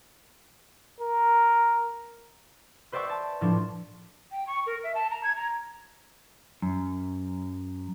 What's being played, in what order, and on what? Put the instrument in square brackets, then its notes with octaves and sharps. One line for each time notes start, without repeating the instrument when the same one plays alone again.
[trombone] A#4
[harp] B4 C5 D5 E5 G5 C#6
A5
A2 F3 D4
[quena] G5
C#6
A#4
E5
A5
A#5
G#6
A#5
[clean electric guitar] F#2